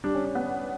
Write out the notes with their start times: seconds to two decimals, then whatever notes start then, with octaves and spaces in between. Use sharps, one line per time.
0.04 G3 D4
0.15 C#4
0.25 D4
0.35 B3